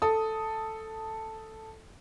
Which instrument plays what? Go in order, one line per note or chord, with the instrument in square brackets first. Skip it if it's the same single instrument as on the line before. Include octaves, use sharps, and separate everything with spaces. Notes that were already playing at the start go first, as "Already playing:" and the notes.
[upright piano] A4 D#6